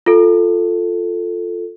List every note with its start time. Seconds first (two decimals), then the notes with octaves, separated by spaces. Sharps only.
0.06 F4 A4